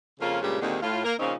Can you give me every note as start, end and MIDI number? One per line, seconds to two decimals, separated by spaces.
0.20 0.41 41
0.20 0.41 49
0.20 0.41 58
0.20 0.41 61
0.20 0.41 65
0.41 0.59 43
0.41 0.59 46
0.41 0.59 49
0.41 0.59 55
0.41 0.59 56
0.60 0.77 39
0.60 0.77 46
0.60 0.77 50
0.60 0.77 51
0.60 0.77 56
0.60 0.77 60
0.82 1.00 45
0.82 1.00 65
1.04 1.13 58
1.04 1.13 70
1.18 1.33 46
1.18 1.33 49
1.18 1.33 53
1.18 1.33 60
1.18 1.33 61
1.18 1.33 63